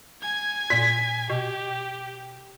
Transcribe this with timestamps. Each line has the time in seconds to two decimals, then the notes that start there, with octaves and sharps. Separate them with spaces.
0.22 G#5 G#6
0.70 A#2 B6
1.30 B2 G4